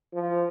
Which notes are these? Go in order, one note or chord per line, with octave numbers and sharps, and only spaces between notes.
F3